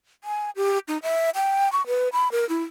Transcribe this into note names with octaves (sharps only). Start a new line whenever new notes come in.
G#5
G4
D#4
E5
G5
C#6
B4
B5
A#4
E4